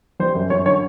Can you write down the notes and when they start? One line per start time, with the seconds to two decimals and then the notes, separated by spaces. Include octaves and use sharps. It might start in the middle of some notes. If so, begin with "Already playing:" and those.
0.20 G3 C5
0.35 F#2
0.50 F#2 C#5
0.66 D3 C#5